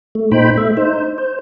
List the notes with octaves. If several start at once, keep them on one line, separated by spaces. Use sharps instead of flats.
A3
A#2 D#4 C5 G5 B5
A3 E5
D#4 C5
C5